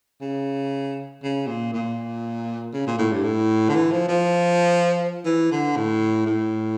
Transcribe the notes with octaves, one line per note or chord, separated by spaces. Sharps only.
C#3
C#3
A#2
A#2
C#3
A#2
A2
G2
A2
D3
E3
F3
F3
E3
D3
A2
A2